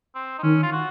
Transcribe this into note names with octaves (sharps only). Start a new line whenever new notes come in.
C4
D#4
D#3 C#4
F4
F#4